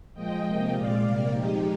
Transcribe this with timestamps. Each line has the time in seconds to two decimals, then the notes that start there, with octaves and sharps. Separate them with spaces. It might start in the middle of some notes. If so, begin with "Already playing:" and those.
0.14 A#2 F3 G#3 D#5 G5
0.43 C3 F3 A#3
0.72 A#2 G#3 D5 F5
1.01 C3 G3 A#3
1.30 A#2 F3 G#3 D#4 G4